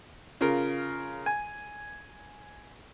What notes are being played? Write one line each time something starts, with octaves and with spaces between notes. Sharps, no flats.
C#3 F4 A#4
G#5